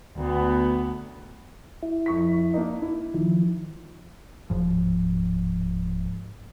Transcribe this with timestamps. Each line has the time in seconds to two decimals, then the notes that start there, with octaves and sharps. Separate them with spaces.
0.16 D2 B3
1.83 E4
2.06 F2 C#6 B6
2.54 A#3 D4 D#4
2.82 E4
3.14 D#3 F3
4.50 D1 G#2 F3